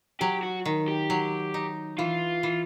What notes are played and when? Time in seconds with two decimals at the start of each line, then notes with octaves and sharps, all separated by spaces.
0.21 F#3 G4
0.43 F#4
0.66 D#3
0.88 G4
1.10 F#3
1.54 D#4
1.99 E3 F4
2.43 E3